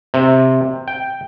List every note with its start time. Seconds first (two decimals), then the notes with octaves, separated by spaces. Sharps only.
0.14 C3
0.88 G5